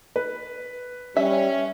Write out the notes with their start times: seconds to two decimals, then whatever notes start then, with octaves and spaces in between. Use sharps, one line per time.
0.16 B4
1.17 G3 C#4 E5